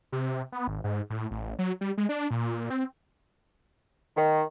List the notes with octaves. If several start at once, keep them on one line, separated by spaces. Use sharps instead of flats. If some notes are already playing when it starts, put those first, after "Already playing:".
C3
B3
G#1
G#2
A2
A1
F#3
G3
G#3
D4
A#2
C4
D#3